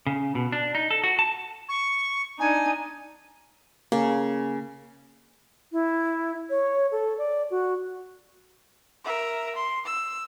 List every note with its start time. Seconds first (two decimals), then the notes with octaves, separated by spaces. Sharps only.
0.07 C#3
0.35 B2
0.52 D4
0.75 D#4
0.90 A4
1.04 F#4
1.19 A5
1.69 C#6
2.40 D4 D#4 G#5
3.92 C#3 A#3
5.72 E4
6.50 C#5
6.92 A4
7.18 D5
7.51 F#4
9.04 A#4 E5
9.56 C6
9.86 E6